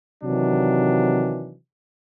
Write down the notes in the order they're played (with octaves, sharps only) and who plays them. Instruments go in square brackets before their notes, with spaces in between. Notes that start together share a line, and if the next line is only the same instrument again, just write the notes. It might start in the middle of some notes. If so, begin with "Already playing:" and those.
[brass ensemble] C3 D#3 E3 F#3 D4